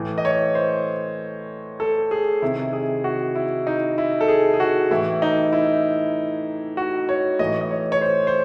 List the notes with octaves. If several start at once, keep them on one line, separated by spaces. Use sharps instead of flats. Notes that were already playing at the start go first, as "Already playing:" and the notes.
Already playing: A2 E3
D#5
C#5
C5
A4
G#4
C3 D#3 E4
G#4
F#4
E4
D#4
E4
A4
G#4
G#4
F#4
A2 E3 E4
D#4
E4
F#4
C#5
A2 E3 D#5
D#5
C#5
C#5
C5
C5